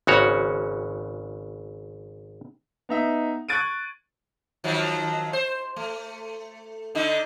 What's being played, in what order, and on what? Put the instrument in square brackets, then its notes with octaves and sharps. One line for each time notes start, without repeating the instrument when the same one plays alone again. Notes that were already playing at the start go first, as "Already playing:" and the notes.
[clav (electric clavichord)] G#1 C#3 F#4 C#5
[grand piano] B3 D#4 E5
C#6 F#6 G#6 A6 D7 D#7
[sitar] D#3 F3 F#3
C5
A3
D3 D#4